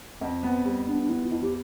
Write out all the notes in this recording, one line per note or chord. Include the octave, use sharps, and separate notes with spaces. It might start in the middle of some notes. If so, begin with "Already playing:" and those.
F2 C4
B3
G3
B3 D4
D4
B3 E4
F4
F2 E4
G4